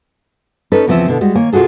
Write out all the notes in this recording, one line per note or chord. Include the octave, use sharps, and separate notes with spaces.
C#4 D#4 A4 B4
E2 C#3 F3 C4 E5
B2 D3
G3 G#3 F#4
D#3 A#3 C#5 G#5
C3 F4 F#4 G#4 A4